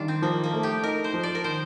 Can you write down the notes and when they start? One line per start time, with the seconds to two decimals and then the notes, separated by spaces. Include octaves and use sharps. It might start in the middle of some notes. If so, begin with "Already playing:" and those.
Already playing: D#3 G3 D4 F4
0.08 C4
0.22 F3 A#3
0.44 A#3
0.53 A3
0.63 G4
0.83 D#4 A#4
1.04 C5
1.13 F3
1.23 D5
1.35 A#4
1.44 D#3 C5